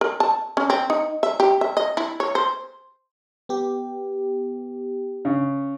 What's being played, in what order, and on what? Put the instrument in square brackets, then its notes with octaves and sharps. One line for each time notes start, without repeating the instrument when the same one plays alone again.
[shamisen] A#4
A5
C#4
C4
D#4
E5
G4
E5
D#5
E4
C#5
C5
[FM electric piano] B3 G4
[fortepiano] C#3